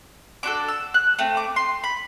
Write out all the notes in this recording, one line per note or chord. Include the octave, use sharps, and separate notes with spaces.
D4 F#4 A4 D6
E6
F#6
A3 C4
D6
C6
B5